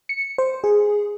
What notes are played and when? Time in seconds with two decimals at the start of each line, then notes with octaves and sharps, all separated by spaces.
0.09 C#7
0.38 C5
0.64 G#4